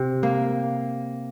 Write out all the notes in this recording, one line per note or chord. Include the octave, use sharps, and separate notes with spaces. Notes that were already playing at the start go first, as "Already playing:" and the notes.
Already playing: C3
A#3